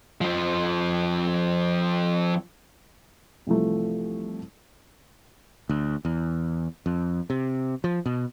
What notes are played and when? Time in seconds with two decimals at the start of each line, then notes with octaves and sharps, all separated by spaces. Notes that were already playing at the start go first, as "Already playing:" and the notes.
0.21 F2 F3
3.47 C2 E3 F3 A3
5.69 D2
6.05 E2
6.86 F2
7.30 C3
7.84 F3
8.06 B2